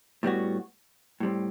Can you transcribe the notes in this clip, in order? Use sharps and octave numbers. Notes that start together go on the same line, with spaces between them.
A2 G3 B3 F#4
A2 G3 C4